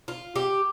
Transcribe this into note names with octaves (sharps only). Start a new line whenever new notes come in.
F4
G4